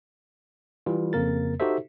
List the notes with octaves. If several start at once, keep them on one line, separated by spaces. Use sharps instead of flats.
E3 G3 F4
F2 C#3 A#3 A#4 A6
D#4 F#4 G4 A4 C5 E5